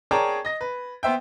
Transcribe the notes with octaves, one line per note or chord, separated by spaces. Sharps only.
G#4 A#4 C#5 D5 G5 A5
D#5 A#6
B4
B3 C5 E5 G5